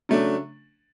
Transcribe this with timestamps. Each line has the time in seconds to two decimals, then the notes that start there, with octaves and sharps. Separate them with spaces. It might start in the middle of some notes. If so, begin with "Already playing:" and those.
0.09 C#3 F#3 A3 D4